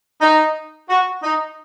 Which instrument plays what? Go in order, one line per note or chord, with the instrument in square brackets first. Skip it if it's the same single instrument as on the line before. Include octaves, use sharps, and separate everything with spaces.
[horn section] D#4
F#4
D#4